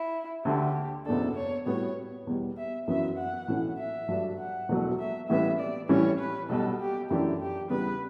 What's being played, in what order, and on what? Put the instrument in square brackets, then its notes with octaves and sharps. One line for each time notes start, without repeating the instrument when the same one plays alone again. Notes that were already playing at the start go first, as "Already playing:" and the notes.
Already playing: [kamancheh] E4
[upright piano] D2 D3 A3 [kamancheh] G4
[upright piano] F#1 E2 B2 A3 D4 [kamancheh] A4
[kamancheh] C#5
[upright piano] A2 G3 B3 F#4 [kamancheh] C#5
[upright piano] E2 B2 G3
[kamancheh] E5
[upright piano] F#2 E3 B3 F#4 [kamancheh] E5
[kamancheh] F#5
[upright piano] B1 A2 E3 A3 C#4
[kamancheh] E5
[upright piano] G2 F#3 A3 D4
[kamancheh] F#5
[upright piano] E1 E2 B2 F#3 A3
[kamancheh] E5
[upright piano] A1 A2 E3 G3 B3 [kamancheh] E5
[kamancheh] D5
[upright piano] A2 E3 G3 C#4 [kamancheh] C#5
[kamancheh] B4
[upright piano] B1 B2 G3 [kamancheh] A4
[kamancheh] G4
[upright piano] F#2 E3 A3 D4 [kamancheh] G4
[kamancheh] G4
[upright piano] E2 C#3 G3 B3 [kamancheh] B4